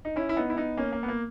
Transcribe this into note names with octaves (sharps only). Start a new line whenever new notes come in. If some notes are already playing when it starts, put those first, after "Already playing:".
D#4
C#4 E4
E4
B3 D#4
E4
B3 D#4
A#3 C#4
A#3
B3
A#3